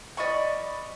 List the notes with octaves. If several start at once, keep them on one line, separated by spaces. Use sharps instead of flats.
D5 D#5 B5 C#6